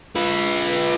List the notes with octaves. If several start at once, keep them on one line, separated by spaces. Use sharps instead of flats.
F4 B4